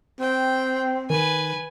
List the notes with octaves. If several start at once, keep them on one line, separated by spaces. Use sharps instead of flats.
C4 G5
D#3 B4 G#5